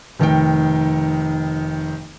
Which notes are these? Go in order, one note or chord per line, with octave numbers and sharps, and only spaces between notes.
F1 D#3 D#4 G5